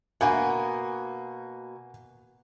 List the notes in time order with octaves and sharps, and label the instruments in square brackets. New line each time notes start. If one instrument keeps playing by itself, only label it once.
[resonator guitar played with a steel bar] B2 A#3 [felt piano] F#5 G#5